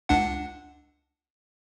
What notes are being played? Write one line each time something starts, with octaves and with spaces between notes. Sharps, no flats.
C#2 D4 F#5